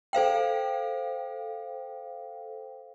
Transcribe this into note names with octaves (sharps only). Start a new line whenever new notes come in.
A4 C5 F5 G5